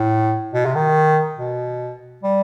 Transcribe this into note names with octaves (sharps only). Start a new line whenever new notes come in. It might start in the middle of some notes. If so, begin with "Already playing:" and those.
Already playing: A2
B2
C3
D#3
B2
G3